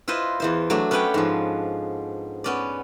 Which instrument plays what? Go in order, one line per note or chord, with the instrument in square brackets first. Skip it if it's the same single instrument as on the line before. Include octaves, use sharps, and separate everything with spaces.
[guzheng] E4 F4 B4 C5 D#5
E2 E3 C5
F#3 A3 D4
B3 C#4 D4 B4 F#5 G5
G#2 F3
B3 C#4 D5